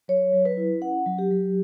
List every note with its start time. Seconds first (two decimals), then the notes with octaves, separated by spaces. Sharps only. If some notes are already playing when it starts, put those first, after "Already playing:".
0.08 F#3 C#5
0.33 F#3
0.45 B4
0.57 E4
0.81 C#4 F#5
1.06 F#3
1.19 G4
1.31 F#3